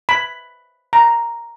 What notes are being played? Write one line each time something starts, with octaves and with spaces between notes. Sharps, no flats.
B5
A#5